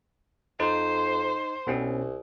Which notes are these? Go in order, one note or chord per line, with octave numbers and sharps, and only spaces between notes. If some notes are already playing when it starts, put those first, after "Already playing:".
F2 D#4 C5
C2 B2 C4 C#4